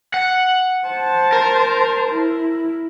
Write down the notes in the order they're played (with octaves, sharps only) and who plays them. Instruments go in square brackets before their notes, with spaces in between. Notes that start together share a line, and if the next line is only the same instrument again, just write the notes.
[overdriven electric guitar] F#5
[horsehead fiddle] C5 A5
[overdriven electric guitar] A#4
[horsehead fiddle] E4